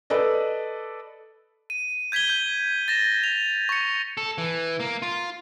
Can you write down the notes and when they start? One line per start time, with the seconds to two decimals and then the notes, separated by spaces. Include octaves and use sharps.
0.10 A4 B4 D5 D#5
1.70 D#7
2.12 G6 G#6 B6 D#7 G7
2.29 G6
2.88 A6 A#6 E7
3.24 F7
3.69 C#6 C#7
4.17 A4
4.38 E3
4.80 A#3
5.02 F4